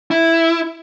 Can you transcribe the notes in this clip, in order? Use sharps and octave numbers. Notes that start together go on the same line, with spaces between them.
E4